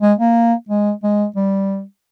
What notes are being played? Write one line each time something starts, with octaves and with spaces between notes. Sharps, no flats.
G#3
A#3
G#3
G#3
G3